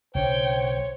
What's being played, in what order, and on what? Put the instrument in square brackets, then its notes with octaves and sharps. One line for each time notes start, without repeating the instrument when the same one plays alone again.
[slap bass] B1 C#3 D4 [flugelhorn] C5 [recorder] C#5 [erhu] G5